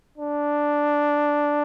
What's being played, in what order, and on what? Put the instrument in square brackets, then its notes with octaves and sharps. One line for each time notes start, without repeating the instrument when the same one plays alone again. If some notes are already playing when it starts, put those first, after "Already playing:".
[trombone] D4